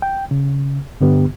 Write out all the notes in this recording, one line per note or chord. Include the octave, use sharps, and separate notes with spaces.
G5
C#3
G2 D3 B3 G4